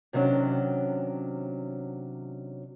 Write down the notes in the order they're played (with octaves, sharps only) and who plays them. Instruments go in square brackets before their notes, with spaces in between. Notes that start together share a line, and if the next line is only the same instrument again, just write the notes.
[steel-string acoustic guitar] C3 D#3 F#3 C#4 D4